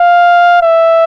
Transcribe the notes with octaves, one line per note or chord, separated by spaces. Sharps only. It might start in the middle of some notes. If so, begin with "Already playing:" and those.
Already playing: F5
E5